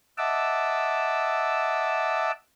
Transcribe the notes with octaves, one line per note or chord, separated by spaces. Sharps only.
D#5 E5 F#5 A5 D6 E6